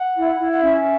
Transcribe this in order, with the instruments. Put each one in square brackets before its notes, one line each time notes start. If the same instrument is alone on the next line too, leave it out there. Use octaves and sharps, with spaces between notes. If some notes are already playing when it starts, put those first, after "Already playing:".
Already playing: [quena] F#5
[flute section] E4
E4
[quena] F#5
[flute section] C#4 [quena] E5